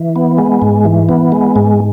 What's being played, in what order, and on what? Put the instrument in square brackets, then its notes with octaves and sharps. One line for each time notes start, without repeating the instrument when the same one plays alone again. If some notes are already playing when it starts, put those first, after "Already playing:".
Already playing: [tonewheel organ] E3
B3
G#3
G#2
E3
B3
G#3
G#2